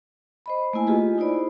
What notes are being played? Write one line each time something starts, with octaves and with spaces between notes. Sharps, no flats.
C5 D#5 B5
A3 A#3 E4 G#5
F4 G4 G#4 B4 D#5
D#4 E4 C5 D5 B5